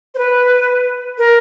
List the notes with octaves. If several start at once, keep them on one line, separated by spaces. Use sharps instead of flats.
C5
B4
A#4